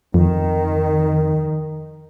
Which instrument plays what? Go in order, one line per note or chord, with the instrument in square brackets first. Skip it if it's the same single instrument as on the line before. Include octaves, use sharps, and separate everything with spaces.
[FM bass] F2 [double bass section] D#3